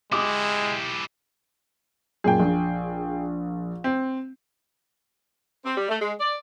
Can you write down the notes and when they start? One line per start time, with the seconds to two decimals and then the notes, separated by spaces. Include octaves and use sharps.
0.12 G#3 E4 G4 D6 D#6
2.24 F#2 A#2 G#4 G5
2.40 A#1
3.84 C4
5.64 C4
5.77 G3
5.88 A3
6.00 G#3
6.20 D5